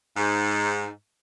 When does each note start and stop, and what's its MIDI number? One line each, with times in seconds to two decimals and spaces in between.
0.17 0.90 44